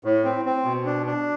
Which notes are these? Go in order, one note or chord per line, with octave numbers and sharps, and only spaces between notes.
A2
C4
C4
B2
D4
D4